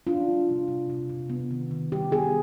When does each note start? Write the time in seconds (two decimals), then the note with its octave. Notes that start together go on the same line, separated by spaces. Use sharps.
0.07 D4 F4
0.28 G3
0.49 C3
0.68 C3
0.90 C3
1.10 C3
1.30 B3
1.51 D#3
1.71 D#3
1.92 G3 G4
2.11 B3 G#4